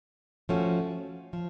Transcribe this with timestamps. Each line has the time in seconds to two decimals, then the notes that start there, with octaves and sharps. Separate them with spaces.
0.49 F3 A3 C#4 F#4
1.33 F3